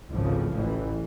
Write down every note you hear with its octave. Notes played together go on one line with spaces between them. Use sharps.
G#1 C#2 A2 C#3 E3 F3
A1 E3